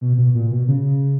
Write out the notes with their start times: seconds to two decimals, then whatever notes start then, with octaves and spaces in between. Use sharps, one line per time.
0.01 B2
0.18 B2
0.35 A#2
0.51 B2
0.68 C#3